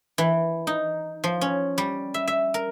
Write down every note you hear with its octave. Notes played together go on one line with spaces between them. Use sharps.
E3
D#4
F3
C#4
G3
E5
E5
A#4